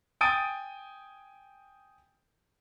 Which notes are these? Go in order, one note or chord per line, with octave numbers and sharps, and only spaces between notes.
G5 G#5 D#6 A6 D7 D#7